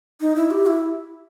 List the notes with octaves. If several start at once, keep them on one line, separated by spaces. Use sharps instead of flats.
D#4
E4
G4
E4